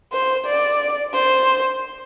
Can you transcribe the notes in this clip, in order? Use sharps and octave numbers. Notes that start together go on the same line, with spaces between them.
C5
D5
C5